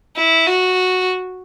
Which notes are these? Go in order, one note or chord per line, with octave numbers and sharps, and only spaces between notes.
E4
F#4